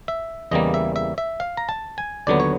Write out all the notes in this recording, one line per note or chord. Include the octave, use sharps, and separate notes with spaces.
E5
E2 C#3 E3 G3 A#3 D#5
E5
E5
E5
F5
A#5
A5
G#5
D#2 D3 F#3 B3 D5
C#5